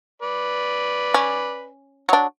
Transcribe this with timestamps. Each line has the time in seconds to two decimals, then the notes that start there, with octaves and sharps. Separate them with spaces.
0.22 B4 D5
1.14 C#4
2.09 F#3 D4